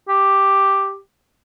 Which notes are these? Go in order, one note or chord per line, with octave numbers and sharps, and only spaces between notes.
G4